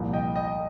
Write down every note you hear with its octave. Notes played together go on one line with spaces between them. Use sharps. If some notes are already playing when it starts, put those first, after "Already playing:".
Already playing: C2 A#2 F3
D#5 G5
D#5 G5